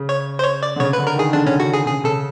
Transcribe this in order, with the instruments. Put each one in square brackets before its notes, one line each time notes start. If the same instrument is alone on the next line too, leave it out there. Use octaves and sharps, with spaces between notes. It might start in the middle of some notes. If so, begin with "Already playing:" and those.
Already playing: [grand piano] C#3
[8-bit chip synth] C#5
C5
C#5
D5
[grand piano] D3
[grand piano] C#3 [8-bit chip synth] C#5
[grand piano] D3 [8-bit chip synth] B4
[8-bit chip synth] A#4
[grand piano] D#3
[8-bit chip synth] G#4
[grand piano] D3 [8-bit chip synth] D4
[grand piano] C#3 [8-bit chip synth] C#4
[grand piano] D3 [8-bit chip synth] F#4
[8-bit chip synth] G#4
[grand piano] C#3 [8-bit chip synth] G#4
[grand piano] C#3 [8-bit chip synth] A4